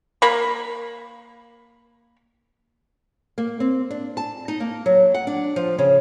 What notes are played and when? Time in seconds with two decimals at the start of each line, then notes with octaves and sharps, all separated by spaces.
0.22 A#3 B5
3.38 A#3
3.60 C4
3.91 D4
4.17 A5
4.48 D#4
4.60 A#3
4.86 F#3
5.14 F#5
5.27 D4
5.56 F3
5.78 C#3